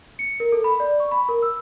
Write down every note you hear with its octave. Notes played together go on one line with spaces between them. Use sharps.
C#7
A#4
A4
B5
D5
C#6
B5
A#4
E6